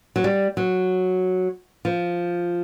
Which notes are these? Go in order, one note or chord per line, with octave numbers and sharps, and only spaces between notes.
F#3
G3
F#3
F3